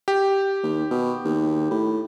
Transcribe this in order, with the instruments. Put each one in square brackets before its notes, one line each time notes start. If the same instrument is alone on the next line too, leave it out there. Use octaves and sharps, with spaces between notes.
[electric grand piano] G4
[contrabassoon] D#2
B2
D#2
A2